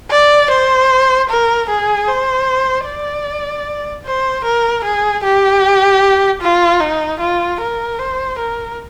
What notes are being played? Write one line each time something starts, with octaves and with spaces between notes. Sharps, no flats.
D5
C5
A#4
G#4
C5
D5
C5
A#4
G#4
G4
F4
D#4
F4
A#4
C5
A#4